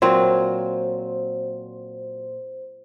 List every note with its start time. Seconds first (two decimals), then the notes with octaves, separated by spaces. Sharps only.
0.02 A#2 F#3 C4 C5